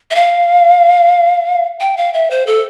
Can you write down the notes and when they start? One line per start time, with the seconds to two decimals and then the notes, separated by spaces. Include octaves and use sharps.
0.11 E5
0.15 F5
1.80 G5
1.97 F5
2.14 E5
2.31 C5
2.47 A4